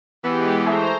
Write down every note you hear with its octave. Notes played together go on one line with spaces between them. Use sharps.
E3 G#3 B3 G4
A3 G#4 C5 E5 A#5